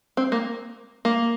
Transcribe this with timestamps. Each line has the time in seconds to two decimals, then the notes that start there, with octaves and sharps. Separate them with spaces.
0.17 C4
0.32 A#3
1.05 A#3